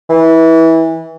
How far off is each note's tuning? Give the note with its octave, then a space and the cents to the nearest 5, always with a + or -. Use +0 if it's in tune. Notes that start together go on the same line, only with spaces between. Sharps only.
E3 -20